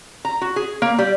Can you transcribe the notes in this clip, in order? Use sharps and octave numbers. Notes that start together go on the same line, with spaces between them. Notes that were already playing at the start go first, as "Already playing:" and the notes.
A#5
F#4
G#4
A#3
G3